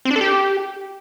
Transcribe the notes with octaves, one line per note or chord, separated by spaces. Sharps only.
C4
D4
A4
G4